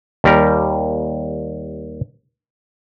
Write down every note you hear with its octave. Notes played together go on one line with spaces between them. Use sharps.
D#2 G3 A#4